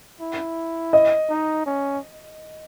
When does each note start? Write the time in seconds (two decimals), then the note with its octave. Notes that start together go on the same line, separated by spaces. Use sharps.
0.21 E4
0.93 D#5
1.29 D#4
1.66 C#4